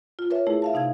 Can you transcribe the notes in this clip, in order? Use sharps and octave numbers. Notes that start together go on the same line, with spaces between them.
F4
A#4 B4 C#5 E5
A3 E4 G#4
E5 F5 A5
C3 D#4 F5 G#6